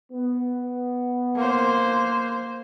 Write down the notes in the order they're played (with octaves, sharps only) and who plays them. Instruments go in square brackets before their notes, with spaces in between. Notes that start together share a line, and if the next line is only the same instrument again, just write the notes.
[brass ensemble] B3
[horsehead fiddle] A#3 C5